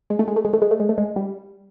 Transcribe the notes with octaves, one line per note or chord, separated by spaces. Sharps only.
G#3
A3
G#3
A3
G#3
A3
G#3
A3
G#3
A3
G#3
G3